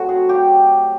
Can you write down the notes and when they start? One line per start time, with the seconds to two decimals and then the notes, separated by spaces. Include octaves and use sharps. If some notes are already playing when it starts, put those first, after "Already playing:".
Already playing: A2 F#3 A3 C4 F#4
0.09 G#4
0.29 G4